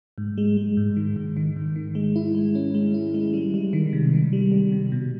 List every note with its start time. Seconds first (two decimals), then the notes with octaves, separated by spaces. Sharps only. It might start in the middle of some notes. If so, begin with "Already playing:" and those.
0.18 G#2
0.38 G#3
0.57 G#3
0.77 G#2
0.97 D#3
1.16 G#2
1.37 D#3
1.56 G#2
1.76 D#3
1.95 G#3
2.16 E4
2.35 G#3
2.55 C#4
2.74 G#3
2.94 E4
3.14 G#3
3.34 G3
3.54 G3
3.73 D#3
3.93 C3
4.13 D#3
4.33 G3
4.52 G3
4.72 C3
4.92 B2